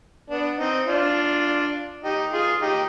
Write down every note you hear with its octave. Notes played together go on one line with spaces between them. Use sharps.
B3 D4
C4 D#4
D4 F4
D#4 G4
F4 G#4
D#4 G4